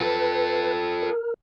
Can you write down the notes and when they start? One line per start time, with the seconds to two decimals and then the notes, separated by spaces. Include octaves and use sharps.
0.01 F4 A4 B4
1.03 A#4